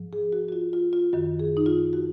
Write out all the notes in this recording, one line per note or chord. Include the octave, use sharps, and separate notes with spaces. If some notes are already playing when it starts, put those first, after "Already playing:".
Already playing: G#2 F3
G#4
F#4
F#4
F4
F4
F4
F#2 D#3 F#4
G#4
D#4
F4
F#4